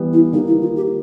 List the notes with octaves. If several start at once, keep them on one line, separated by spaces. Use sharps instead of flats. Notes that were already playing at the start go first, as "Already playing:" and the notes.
Already playing: E3 G3 B3
E4
D#3 G3 A#3 D#4
E4
F4
G4